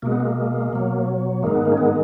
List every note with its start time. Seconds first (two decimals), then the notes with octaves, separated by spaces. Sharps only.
0.02 B2 G#3 A#3
0.12 B3
0.20 A#3
0.73 B2 F#3
1.43 G#2 D#3 G#3 A#3
1.54 B3
1.65 A#3
1.72 C#4
1.78 B3